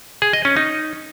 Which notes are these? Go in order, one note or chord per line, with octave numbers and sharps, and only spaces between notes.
G#4
D#5
C#4
D#4